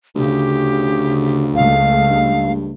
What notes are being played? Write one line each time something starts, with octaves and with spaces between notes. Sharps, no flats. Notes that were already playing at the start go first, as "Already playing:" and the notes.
D2 C#3 G4
C#2 G#3 A3 F5
G2